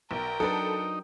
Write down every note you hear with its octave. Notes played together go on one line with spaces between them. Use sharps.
B1 A#4 G5
F#3 D4 D#4 A4 B4